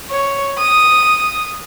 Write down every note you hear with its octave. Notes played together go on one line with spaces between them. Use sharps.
C#5
D#6